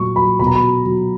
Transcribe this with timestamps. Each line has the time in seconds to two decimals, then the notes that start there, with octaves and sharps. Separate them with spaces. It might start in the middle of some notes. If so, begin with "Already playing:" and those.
Already playing: A#2 F#3 C#6
0.16 F#3 B5
0.39 B2 B5
0.47 A#5
0.56 B5
0.62 F#3
0.86 F#3